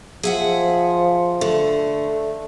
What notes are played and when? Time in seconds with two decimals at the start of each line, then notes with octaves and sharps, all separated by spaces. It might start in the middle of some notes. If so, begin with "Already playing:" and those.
0.23 F3 G#4 E5 F#5
1.41 D3 A3